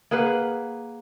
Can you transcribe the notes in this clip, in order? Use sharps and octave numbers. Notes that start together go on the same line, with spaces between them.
A#3 G#4 B4 F#5